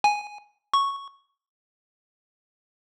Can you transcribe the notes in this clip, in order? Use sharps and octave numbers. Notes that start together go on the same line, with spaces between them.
G#5
C#6